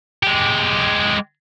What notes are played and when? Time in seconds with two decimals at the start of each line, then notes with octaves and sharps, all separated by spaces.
0.23 G#3 G4